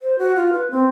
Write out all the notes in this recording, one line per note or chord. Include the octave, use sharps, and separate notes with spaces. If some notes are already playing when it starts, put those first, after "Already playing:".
C5
F#4
F4
B4
C4